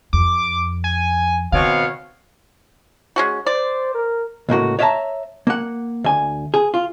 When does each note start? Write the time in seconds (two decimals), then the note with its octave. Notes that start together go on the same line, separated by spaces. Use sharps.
0.13 F2 D6
0.84 G#5
1.52 B2 D#3 C4 C#5 F5
3.16 G#3 C#4 F#4
3.46 C5 D5
3.95 A#4
4.49 C#2 A2 A#3 F#4
4.79 C#5 D5 E5 F5 A5 A#5
5.47 A#3 F#5
6.04 D2 G#5
6.54 G#4
6.74 F4